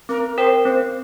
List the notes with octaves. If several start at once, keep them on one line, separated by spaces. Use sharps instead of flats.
C4 A#4
A#4 C5 G5
C4 C5